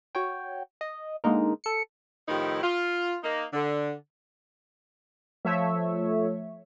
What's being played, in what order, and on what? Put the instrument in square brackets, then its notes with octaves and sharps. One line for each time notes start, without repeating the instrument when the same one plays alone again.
[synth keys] F#4 C#5 G5
D#5
D3 G#3 A#3 D#4 A#4
A4 C#7
[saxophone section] A2 D#3 F3 D#4 E4 G4
F4
A#3 D#4
D3
[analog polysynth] F3 A3 C#5 E5